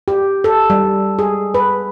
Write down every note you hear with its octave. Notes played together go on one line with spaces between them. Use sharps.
G4
A4
G3
G#4
B4